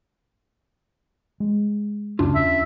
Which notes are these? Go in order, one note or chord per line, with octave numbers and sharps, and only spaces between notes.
G#3
C#2 F#2 C#3 C#4 D4 F4
E2 E5